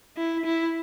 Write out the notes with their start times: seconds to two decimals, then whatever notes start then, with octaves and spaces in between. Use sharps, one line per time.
0.17 E4
0.45 E4